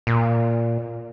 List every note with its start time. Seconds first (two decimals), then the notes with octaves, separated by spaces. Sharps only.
0.07 A#2